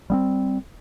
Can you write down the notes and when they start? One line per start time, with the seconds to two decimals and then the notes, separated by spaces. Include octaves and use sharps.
0.10 G3 B3 C4